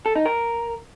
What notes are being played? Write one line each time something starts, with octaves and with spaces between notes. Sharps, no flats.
A4
D#4
A#4